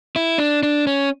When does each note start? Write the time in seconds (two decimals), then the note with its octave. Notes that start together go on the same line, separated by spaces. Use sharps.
0.16 E4
0.38 D4
0.63 D4
0.87 C#4